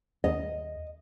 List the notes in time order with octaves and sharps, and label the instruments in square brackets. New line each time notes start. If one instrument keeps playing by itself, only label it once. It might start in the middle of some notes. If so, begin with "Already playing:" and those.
[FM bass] D#2 [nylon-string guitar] D#5